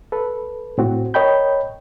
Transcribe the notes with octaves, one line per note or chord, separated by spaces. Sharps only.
A4 B4
A2 C4 F#4
A#4 C#5 D#5 G5 B5 G6